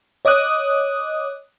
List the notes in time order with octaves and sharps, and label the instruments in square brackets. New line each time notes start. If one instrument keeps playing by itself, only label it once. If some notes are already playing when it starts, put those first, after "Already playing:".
[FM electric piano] C#5 D#5 D6 D#6 F#6